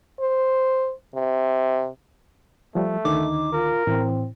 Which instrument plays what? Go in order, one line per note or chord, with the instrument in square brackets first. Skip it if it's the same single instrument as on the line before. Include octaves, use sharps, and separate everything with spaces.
[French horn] C5
C3
[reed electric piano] F3 G3 [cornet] A3
[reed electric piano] D2 D3 D#3 [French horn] D#4 [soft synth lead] D6
[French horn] F4 [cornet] A#4
[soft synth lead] A2 [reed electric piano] E3 [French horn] C4